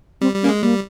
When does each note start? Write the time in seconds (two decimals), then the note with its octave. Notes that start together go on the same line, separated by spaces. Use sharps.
0.21 G3 C4
0.35 G3
0.43 A#3 C#4
0.49 G#3
0.62 G3 A#3